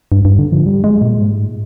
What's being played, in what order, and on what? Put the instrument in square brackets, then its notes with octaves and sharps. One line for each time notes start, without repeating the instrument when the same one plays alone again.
[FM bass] G2
G2
D3
F3
G3
G#3
A#2
G#2